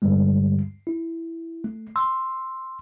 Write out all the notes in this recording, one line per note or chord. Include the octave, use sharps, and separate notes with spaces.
G2 D3 G3 G#3
E4
A3
C6 E6